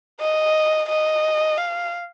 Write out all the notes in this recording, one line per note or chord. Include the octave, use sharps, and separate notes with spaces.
D#5
D#5
F5